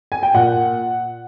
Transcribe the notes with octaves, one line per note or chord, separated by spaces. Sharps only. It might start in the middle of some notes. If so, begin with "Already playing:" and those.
G#5
G5
A#2 F#5